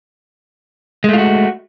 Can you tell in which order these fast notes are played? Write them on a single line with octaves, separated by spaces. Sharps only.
G#3 A3 F4 F#4